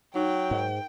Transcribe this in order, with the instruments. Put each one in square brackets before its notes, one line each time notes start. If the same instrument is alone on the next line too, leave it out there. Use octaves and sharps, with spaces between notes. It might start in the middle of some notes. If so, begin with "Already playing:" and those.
[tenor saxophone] F#3 [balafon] D#4 [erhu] G5
[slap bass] G#2 [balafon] A#4